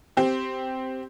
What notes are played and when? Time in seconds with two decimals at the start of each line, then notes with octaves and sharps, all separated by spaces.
0.17 C4 G4